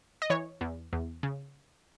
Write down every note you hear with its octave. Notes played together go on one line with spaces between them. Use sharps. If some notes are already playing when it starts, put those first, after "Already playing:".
D#5
E3 C#5
E2
E2
C#3